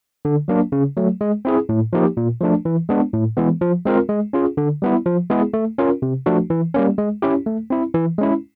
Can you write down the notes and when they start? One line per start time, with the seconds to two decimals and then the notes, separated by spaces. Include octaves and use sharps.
0.25 D3
0.48 F#3 A#3 D4
0.72 C#3
0.97 F#3 A3
1.21 G#3
1.45 C4 E4 G#4
1.69 A2
1.93 F3 A#3 D#4 G4
2.17 A#2
2.41 F3 A3 D4
2.65 E3
2.89 G#3 B3 D4
3.13 A2
3.37 E3 G#3 B3
3.61 F3
3.85 G#3 C4 F4 A#4
4.09 G#3
4.33 C#4 F4 G#4
4.57 D3
4.82 G3 B3 E4
5.06 F3
5.30 G#3 B3 E4 G#4
5.54 A3
5.78 C#4 F4 A#4
6.02 C3
6.26 F3 A3 D4 F#4
6.50 E3
6.74 G3 A#3 C#4
6.98 G#3
7.22 C#4 E4 G4
7.46 A3
7.70 C4 E4
7.95 E3
8.18 G#3 C#4 E4